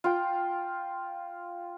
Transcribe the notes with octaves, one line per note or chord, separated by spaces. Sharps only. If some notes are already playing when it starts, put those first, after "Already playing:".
F4 G5